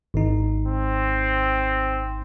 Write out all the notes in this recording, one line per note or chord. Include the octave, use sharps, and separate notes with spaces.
G#1 D#4
C4